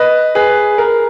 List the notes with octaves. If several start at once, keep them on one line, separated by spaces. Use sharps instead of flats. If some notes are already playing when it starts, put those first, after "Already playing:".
Already playing: B4 D#5
G#4 B4
A#4